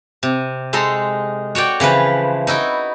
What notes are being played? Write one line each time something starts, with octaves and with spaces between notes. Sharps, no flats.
C3
G#3 D#4 A4 A#5 C6
F#4 C#5 D5 G5
C#3 E3 F3 B4
D#4 E4 F#4 G5